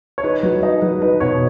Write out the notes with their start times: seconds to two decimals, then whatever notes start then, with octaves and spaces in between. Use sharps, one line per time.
0.18 C#5
0.23 D#4 B4
0.43 F#3 B4
0.63 D#4 D#5
0.82 F#3 B4
1.02 D#4 B4
1.20 B2 C#5